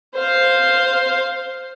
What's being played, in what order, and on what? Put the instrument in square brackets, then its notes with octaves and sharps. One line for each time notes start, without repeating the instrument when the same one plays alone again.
[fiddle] C5 F5